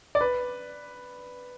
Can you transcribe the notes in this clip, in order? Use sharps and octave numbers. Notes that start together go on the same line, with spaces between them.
D5
B4